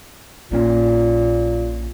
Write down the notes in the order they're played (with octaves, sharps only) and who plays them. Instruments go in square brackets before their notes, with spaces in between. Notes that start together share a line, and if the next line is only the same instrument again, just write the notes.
[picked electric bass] A#1 A#3 C#4 [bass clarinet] A#2